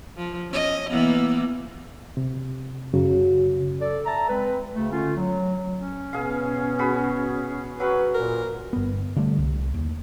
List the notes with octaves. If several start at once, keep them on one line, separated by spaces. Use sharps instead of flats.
F3
C#4 D#5
E3 A#3 B3
C3
F#2 C#3 F#3
A4 D5
E5 A5 A#5
G#3 C4 B4
D2 C#3 A3
D3 A3 C#4 F4
F#3
C#4
B2 B3 G#4 F5
F#4 G#4 B5
F#3 C#4 B4
A#2 A#4
G1 B3
D3 G3 A3 D4
C2
D#2